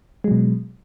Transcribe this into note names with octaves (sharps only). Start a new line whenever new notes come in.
B2 F#3 G#3